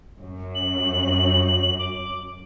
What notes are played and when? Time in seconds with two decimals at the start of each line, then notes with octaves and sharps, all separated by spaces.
0.19 F#2
0.55 F#7
1.79 D6